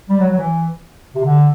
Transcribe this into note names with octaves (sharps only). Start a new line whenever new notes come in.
G3
F#3
F#3
E3
C3
D3